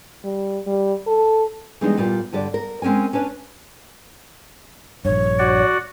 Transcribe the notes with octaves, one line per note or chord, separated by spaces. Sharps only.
G3
G3
A4
E3 G3 G#3 B3 D4 D#4
A#2 G3 B3 F4
G2 D3 G3 D5
A#4
G#3 C4 C#4 A#4 G#5
C#4 D4 B4 C#5
A#1 G2 C#5
F#4 D5 F#5